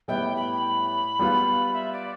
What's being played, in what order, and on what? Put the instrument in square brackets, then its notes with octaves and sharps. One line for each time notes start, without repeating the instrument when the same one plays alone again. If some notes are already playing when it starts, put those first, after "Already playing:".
[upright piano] A2 G3 B3 E4 G4 [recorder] G5
[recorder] B5
[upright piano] G3 B3 F4
[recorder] E5
D5